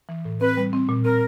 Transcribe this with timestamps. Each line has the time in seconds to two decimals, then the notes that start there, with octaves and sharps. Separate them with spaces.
0.09 E3
0.25 A2
0.41 C4 B4
0.57 G3
0.73 C4
0.89 A#2
1.05 C4 A#4